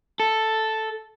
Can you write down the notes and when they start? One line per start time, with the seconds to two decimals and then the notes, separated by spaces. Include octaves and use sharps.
0.20 A4